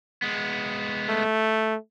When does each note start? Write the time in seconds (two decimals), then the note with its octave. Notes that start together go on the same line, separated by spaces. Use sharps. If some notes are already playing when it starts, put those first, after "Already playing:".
0.22 G#3 B3
1.09 A3